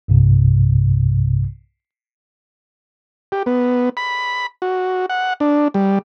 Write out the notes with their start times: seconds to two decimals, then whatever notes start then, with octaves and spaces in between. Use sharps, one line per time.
0.08 B1 G2 C3
3.32 G4
3.46 B3
3.97 B5
4.62 F#4
5.09 F#5
5.40 D4
5.74 G3